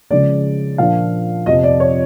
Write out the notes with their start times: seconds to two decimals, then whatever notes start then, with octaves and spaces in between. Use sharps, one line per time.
0.10 C#3 F3 G#3 D5
0.78 A#2 F3 A#3 D4 F5
1.46 F2 C3 F3 D#5
1.63 D5
1.80 C#5